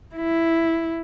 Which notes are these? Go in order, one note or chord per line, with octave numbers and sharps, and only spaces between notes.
E4